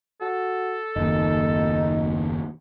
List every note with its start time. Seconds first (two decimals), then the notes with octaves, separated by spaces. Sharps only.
0.21 F#4 A4
0.96 F#1 D#2 D#4